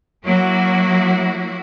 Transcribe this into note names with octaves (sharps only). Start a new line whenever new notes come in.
F#3 A#3 E4 F#4